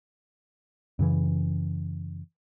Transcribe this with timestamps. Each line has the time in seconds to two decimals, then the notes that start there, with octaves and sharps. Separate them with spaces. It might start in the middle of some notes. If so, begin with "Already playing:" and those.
0.99 F#2 C#3 E3